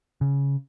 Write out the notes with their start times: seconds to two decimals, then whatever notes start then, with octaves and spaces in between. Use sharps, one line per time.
0.21 C#3